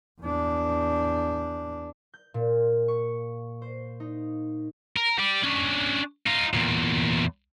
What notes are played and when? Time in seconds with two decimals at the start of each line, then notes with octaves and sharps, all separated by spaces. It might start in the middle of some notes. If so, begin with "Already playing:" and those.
0.21 E2 D4
2.14 G6
2.34 A#2
2.88 C#6
3.62 C5
4.00 D#4
4.96 A#4
5.18 G4 D5
5.43 C#4 D4
6.26 D#4 F4
6.54 E2 A#2